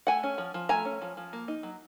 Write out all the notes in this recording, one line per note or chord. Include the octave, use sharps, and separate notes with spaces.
A3 F#5 G#5
C#4
F3
F3
A3 G#5 A#5
C#4
F3
F3
A#3
D#4
F#3